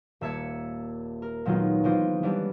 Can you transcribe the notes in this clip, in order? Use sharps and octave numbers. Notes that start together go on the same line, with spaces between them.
D#1 A#3 E5 A5 G#6 C#7
A#4
A#2 D#3 F#3 G#3 B3 F4
E3 G#3 C4 F4
E3 G3 B3 D4